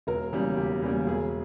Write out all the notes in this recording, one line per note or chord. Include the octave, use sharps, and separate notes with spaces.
E1 A#4
E2 C#3 G3 A#3
E1 G4
E2 C#3 G3 A#3
E1 G#4